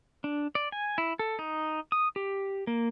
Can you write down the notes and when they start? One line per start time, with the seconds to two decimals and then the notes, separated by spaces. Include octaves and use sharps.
0.24 D4
0.55 D5
0.72 G#5
0.98 E4
1.19 A4
1.39 D#4
1.92 D#6
2.16 G4
2.67 A#3